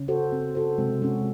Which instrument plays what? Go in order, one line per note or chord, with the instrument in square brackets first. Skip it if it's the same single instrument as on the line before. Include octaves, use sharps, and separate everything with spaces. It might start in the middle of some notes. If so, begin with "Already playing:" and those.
Already playing: [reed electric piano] C#3 C#4
[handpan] F#4 A4 C5
C4
F#4 A4 C5
[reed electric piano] C3 C4 [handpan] G#3
[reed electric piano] G#3 [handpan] C#4 F#4